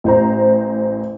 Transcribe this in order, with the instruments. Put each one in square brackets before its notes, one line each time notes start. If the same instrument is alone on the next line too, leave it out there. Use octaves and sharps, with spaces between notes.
[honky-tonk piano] A1 C5 A#5